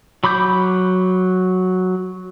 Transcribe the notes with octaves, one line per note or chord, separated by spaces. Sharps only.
F#3 B5 D6 G6